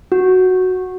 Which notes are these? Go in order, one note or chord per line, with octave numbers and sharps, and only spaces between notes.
F#4